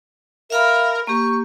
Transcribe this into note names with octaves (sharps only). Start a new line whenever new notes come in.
A#4 E5 F5 B5
A#3 G4 C#6